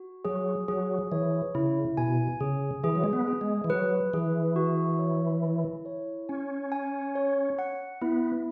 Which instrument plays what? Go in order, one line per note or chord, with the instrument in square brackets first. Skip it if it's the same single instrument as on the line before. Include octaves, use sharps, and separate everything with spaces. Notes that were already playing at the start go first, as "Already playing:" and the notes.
Already playing: [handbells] F#4
[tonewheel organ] F#3 [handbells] G#4
[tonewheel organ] F#3 [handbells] G#4
[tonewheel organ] E3 [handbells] C#5
[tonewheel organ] C#3 [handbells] E4
[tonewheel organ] B2 [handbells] G#5
[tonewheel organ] C#3 [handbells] G#4
[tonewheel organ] E3 [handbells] G#4
[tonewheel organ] F#3
G#3
B3
[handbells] G#4
[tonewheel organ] G#3
E3
[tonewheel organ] F#3 [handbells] B4
[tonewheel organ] E3 [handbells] G#4
[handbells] F#4
C#5
E4
C#5
[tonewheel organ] C#4 [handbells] G#5
[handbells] G#5
C#5
F#5
[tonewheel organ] B3 [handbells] E4